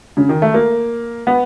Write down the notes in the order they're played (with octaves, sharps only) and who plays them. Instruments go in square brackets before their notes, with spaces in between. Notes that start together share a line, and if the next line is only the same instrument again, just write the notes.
[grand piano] C#3
D#3
A3
A#3
B3